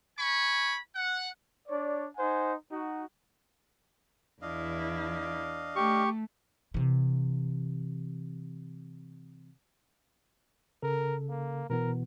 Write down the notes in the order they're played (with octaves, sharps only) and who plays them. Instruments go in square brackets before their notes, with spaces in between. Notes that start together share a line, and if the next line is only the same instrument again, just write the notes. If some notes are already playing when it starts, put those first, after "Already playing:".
[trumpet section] G#5 B5 C#6
F#5
D4 C#5 D5
D#4 C5 F#5 G#5
D#4 F#4
[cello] E2 E4 [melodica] D4 D#5 F5
[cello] A3 [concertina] G4 C#6
[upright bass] C3 E3
[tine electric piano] C#3 A4 [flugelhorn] A#4
[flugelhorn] A#3
[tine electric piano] B2 E3 B3 [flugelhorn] A#4